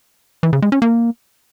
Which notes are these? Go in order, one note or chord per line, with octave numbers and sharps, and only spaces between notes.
E3
C#3
G#3
C#4
A#3